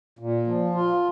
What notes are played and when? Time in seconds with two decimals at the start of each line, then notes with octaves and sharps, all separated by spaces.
0.19 A#2
0.47 F3
0.75 F4